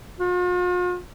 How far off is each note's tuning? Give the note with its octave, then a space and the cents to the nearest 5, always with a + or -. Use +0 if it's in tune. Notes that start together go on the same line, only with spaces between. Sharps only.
F4 +45